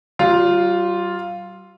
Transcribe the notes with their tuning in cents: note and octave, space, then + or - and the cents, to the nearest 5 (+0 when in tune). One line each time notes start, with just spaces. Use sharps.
G3 -45 F4 +0